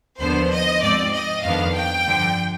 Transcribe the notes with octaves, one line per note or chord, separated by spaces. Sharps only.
D#2 D3 F3 B3 C5
D#5
G#2 F3 C4 D5
D#5
F2 D#3 B3 D4 F5
G5
G2 D3 F3